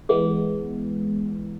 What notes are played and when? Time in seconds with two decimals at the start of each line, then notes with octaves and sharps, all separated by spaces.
0.09 E3 G#3 B3 G#4